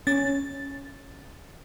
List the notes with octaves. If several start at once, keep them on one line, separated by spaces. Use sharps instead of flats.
C#4 A6